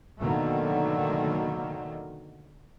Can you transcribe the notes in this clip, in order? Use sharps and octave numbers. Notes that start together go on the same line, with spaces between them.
B2 D3 D#3 F#3 A3 A#3